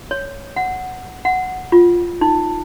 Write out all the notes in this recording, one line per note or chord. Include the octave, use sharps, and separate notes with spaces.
C#5
F#5
F#5
F4
D#4